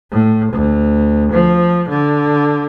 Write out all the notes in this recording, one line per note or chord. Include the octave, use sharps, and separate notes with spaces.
A2
D2
F3
D3